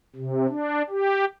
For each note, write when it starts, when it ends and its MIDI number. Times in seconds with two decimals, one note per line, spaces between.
0.16 0.47 48
0.49 0.82 62
0.90 1.25 67